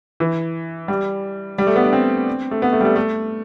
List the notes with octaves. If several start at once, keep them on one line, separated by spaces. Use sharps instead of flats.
E3
G3
G3
A3
B3
D4
C4
A3
B3
A3
G3
A3
A3